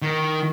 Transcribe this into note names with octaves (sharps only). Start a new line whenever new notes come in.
D#3